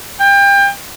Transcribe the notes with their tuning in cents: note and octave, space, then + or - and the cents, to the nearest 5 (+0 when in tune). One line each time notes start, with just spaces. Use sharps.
G5 +30